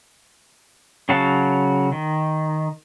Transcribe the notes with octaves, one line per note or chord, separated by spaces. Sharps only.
C#3 F#3 F#4 F5 A5
D#3